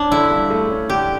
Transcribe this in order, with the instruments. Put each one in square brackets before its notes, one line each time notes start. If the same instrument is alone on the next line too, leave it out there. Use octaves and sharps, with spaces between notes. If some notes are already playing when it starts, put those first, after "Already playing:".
Already playing: [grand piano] C#4 [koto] D4
[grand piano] D3 [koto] E4
[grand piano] G2
A3
C#4
[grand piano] D3 [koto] G4